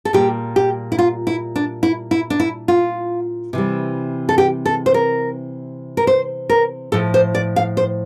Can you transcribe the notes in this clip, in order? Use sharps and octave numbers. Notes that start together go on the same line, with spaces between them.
A4
A#2 G3 G4
G4
E4
F4
E4
D4
E4
E4
D4
E4
F4
C3 E3 G3
A4
G4
A4
C5
A#4
A#4
C5
A#4
A2 F3 A4
C5
D5
F5
C5